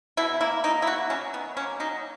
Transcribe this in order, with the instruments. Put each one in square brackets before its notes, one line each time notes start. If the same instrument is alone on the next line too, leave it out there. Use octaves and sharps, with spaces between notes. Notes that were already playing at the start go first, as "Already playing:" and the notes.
[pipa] B2 E4
A#3 E4
A#3 D#4
E4
B2 F#4
F#3 C#4
D#3 B3
A#3 C#4
F#3 D#4